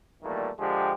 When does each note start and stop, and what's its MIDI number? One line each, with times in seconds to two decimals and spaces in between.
0.23 0.48 40
0.23 0.48 46
0.23 0.48 51
0.23 0.48 52
0.23 0.48 55
0.23 0.48 57
0.59 0.93 50
0.59 0.93 53
0.59 0.93 56
0.59 0.93 67